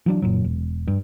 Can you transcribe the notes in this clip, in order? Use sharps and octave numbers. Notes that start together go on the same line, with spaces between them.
E3 F#3 D4
F#1 A#2 F#3
E1
G2